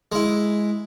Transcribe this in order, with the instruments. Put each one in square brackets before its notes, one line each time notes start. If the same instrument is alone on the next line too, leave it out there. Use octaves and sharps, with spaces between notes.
[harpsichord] G#3 E4